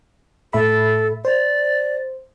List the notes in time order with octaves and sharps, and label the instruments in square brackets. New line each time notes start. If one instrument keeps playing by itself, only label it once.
[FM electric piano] A2 E5 B5 [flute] A4
[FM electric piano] C5 [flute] D5